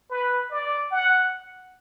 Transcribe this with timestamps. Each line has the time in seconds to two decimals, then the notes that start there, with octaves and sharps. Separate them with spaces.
0.10 B4
0.51 D5
0.92 F#5